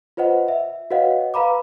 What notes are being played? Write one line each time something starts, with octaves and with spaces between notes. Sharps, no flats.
F4 B4 C5 D#5 F#5
E5
F#4 B4 C#5 D#5 F5 F#5
B4 F5 A#5 B5 D6